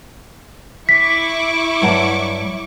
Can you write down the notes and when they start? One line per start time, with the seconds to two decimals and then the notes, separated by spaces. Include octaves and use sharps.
0.89 E4 C#6 D6 B6
1.82 G2 F#3 F#5